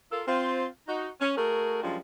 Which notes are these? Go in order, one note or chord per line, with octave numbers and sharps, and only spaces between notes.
F4 A4 A#4
C4 F4 C5
D#4 F#4
C#4
A3 F#4 G#4 A#4
F#2 F3 G3 G#3 D4 F4